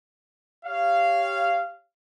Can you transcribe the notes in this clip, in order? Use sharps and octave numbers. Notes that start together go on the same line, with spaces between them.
G4 C#5 F5